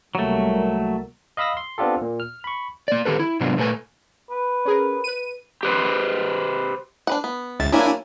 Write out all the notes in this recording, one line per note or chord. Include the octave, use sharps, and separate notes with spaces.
C2 F#3 G3 A3 A#3
D#5 F5 B5 D#6 E6 A#6
C6
B3 C4 D4 F4 G4 A4
A#2
F6
B5 C#6
A#3 D5
D#3 G4 A4 B4
E4
G#2 C3 F#3 B3 D4 F4
A#2 A3 A4 B4 G#5
B4
C#4 G#4 A#4
B4 D#7
G4 B4 C5
D4 B4 F#5
B3
C#2 E5 A6
F#3 A#3 D4 E4 G#5